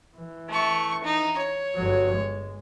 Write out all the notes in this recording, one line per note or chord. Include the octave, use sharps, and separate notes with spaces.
E3
A3 C#6
D#4
C#5
G1 F#3
G#3